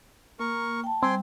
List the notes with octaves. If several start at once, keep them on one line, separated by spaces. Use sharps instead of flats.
A#3 A#4 C#6
G5 A5
G3 C4 G5 G#5 C6